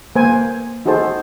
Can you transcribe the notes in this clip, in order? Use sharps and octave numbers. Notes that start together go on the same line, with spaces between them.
A#3 B4 C5 G#5
D#4 F#4 G#4 A4 C5 A5